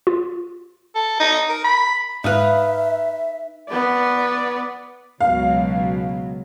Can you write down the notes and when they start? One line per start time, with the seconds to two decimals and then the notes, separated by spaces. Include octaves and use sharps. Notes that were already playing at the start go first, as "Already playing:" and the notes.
0.07 F4
0.95 A4
1.20 D#4
1.49 A#4
1.65 B5
2.24 G#2 D#4 B4 E5 F5 F6
3.69 B3 D5
5.21 C#2 B2 F#3 F5